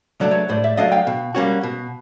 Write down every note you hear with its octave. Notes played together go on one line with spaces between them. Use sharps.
F#3 A3 D4 D5
B4 C#5
A2 C5 D5
D5 E5
F#3 A3 D4 D#5 F5
F5 G5
B2
G3 A#3 C#4 F#4
B2